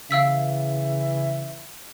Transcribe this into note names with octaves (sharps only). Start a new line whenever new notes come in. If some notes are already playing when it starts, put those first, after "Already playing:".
C#3 E3 E5 F5 E6 B6